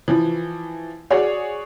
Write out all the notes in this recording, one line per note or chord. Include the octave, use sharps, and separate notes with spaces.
E3 F3
F#4 G#4 C#5 D5